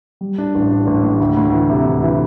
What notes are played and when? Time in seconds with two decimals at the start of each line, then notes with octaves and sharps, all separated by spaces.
0.21 G3
0.38 D4
0.55 A1
0.71 D4
0.87 A1
1.03 A2
1.20 D2
1.37 D2
1.52 E3
1.70 C3
1.86 D2
2.03 E3